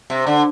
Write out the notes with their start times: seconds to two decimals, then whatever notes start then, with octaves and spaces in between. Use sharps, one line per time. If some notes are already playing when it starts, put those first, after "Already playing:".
0.10 C3
0.27 D3